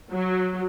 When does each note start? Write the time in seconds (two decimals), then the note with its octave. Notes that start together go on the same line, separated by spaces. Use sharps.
0.12 F#3